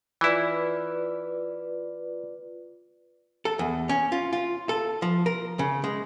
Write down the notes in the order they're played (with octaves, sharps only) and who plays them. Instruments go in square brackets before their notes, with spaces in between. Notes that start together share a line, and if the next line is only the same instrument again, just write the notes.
[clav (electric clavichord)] E3 E4 [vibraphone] F4 B4 D5
[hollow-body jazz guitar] A4
E2
C#4
F4
F4
A4
F3
A#4
C#3
G#3